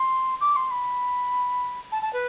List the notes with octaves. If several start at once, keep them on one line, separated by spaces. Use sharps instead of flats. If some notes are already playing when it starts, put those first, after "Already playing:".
Already playing: C6
D6
C6
B5
A5
A5
B4